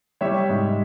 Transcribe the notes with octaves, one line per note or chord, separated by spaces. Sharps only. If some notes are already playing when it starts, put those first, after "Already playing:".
G3 C#5 E5
G#2